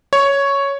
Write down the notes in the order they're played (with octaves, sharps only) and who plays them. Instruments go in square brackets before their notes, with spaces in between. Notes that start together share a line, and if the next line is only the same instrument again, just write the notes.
[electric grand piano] C#5